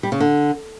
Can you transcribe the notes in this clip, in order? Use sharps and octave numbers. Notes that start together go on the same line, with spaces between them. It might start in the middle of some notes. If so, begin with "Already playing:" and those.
G3
C#3
D3